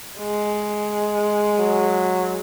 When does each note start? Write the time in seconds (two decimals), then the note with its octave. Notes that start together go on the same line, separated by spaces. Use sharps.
0.19 G#3
1.59 F#3